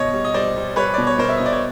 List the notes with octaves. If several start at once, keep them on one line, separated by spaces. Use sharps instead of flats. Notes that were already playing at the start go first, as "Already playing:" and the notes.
Already playing: B2 C#5 D#5
G3
D#5
G3 C5 D5
G3
G3 B4 C#5
B2 D5
C#5
B2 A#4 C5
E5
B2 D#5
D5
C#5